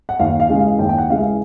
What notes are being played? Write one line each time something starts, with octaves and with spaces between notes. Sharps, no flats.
F#5
D#2 F5
F5
C#3 E3 G#3
F5
D#2 G5
G5
F#5
C#3 E3 G#3 F5
E5